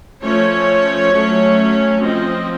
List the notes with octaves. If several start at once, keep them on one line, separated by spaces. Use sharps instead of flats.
F3 A3 C#4 C#5
F#3 A3 C#4
F3 C4 D#5